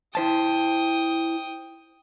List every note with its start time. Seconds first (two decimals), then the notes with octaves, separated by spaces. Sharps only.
0.15 E4 C5 G5 A5 D#6